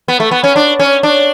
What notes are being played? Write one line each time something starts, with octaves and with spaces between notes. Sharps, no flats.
B3
A3
B3
C#4
D4
C#4
D4